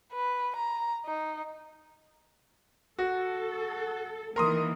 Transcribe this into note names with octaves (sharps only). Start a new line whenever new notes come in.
B4
A#5
D#4
F#4 A4
D#3 E3 A#3 A#4 C6 D#6